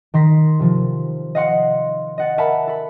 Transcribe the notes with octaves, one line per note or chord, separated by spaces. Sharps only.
D#3 C6 A#6 B6
C3 F3
D#5 F5 F#5 C6 C#7
D#5 F#5 A6
A#4 E5 F#5 G#5 A5 B5
A4 B5